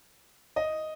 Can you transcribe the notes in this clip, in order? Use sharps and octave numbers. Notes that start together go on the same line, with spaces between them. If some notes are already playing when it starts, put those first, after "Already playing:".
D#5